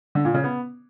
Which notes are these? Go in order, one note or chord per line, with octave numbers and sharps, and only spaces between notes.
D3
A#2
C#3
B3